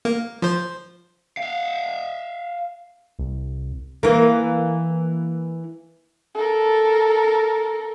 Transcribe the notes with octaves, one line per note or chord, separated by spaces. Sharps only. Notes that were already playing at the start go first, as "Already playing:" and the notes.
A#3
F3 C5
E5 F5
C2
E3 A#3
A4 A#4